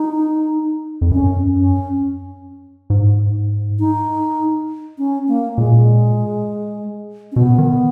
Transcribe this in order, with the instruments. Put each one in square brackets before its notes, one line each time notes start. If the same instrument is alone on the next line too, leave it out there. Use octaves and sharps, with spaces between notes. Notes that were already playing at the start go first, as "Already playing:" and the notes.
Already playing: [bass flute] D#4
[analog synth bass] F2
[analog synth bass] F#2 [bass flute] C#4
[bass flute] C#4
[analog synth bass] G#2
[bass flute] D#4
C#4
A#3
[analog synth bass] A#2 [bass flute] G#3
[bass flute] C#4
[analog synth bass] B2 [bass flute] B3
[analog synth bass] D#3